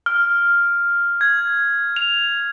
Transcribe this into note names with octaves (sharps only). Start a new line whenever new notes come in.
F6
G#6
F7